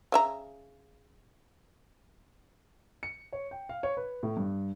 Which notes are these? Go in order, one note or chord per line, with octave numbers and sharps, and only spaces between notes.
C#3 E5 A#5
C#7
C#5
G5
F5
C#5
B4
A2
G2